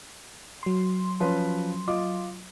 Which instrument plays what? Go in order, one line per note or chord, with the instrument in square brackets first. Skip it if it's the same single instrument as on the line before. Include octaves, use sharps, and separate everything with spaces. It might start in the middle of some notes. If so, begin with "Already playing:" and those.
[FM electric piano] F#3 C6
[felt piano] F3 C#4 B4
F4 D#5 D6